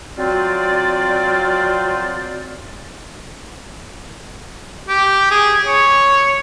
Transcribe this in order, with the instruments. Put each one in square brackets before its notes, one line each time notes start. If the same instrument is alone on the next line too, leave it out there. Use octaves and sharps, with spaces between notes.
[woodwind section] F#3 C4 F4 C5 D5
[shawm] G4
G#4
C#5